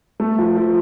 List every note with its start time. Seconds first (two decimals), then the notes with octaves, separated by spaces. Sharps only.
0.20 A3
0.38 F3
0.57 F3